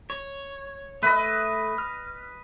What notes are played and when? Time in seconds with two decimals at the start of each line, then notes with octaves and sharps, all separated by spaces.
0.10 C#5
1.03 A3 B4 D#5 E5 E6
1.78 F6